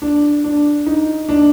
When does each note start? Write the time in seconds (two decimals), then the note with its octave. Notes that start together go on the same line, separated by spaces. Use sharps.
0.02 D4
0.44 D4
0.86 D#4
1.29 D4